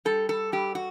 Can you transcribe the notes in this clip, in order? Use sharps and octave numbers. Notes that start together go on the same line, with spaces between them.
G3 A4
A4
G2 G4
F#4